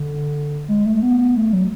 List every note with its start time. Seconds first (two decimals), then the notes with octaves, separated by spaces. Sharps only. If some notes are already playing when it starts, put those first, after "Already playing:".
Already playing: D3
0.68 G#3
0.86 A3
1.02 B3
1.19 B3
1.36 A3
1.53 F#3